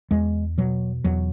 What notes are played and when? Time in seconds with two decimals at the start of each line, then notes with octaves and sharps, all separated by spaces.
0.11 E2 G#3
0.58 B2 F#3
1.04 E2 F#3